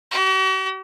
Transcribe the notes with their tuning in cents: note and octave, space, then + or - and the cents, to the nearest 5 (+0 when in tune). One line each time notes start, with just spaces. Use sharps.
F#4 +45